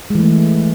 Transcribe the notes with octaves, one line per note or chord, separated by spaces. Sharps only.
E3 G#3 A3